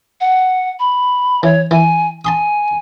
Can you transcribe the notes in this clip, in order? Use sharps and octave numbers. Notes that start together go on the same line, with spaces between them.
F#5
B5
E3 C#5
E3 G#5
G#5 A5 C6 D#6